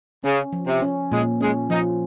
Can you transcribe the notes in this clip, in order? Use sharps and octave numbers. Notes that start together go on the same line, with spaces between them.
C#3 C#4
F3
C3
C#4
A#2 G#3
G#3 C#4
F3 D#4